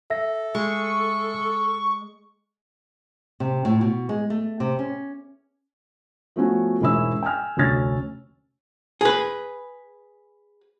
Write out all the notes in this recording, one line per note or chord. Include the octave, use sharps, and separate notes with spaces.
A4 E5 A#6
G#3 C#6
C3
A2
B2
G#3
A3
C3
C#4
F3 A3 B3 C#4 F#4
E1 G#2 C#4 E4 E5 E6
G5 G#5 F6
F1 D2 C#4 C#5 F6 A6
G#4 B4